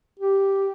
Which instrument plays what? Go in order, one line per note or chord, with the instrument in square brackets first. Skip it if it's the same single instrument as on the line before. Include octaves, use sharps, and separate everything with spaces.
[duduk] G4